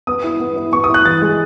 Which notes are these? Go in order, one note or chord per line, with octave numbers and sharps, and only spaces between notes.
B3 D#6
E4
B3
E4
B3 C#6
D#6
E4
F#6
E3 A6
G#3